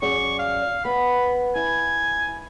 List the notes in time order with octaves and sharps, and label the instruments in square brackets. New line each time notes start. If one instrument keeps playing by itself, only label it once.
[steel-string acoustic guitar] F#2 G#4 D5 [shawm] C#6
[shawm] F5
[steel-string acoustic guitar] B3 [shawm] B5
[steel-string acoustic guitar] E4 [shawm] G#5